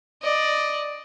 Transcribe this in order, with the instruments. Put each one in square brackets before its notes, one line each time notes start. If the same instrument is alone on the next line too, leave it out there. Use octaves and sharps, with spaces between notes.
[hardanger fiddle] D5 D#5